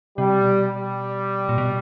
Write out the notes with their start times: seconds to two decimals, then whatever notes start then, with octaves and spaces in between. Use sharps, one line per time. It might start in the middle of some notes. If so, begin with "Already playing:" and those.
0.18 C3 G3
0.41 B2
0.65 G3
1.49 A#2
1.58 B2